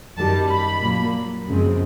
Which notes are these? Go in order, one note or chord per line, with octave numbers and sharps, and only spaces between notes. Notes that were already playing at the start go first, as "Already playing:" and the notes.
F#2 D#3 G3 A5
B5
A#2 F#3 A#3
F#2 C#3 F3 G#3 C4